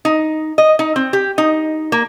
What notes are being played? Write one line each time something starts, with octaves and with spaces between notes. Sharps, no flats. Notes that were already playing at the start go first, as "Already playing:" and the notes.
D#4
D#5
D#4
C4
G4
D#4
A#3